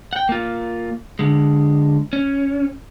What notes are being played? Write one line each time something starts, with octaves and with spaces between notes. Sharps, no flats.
F#5 G5
A#3 F4
D3 G#3
C#4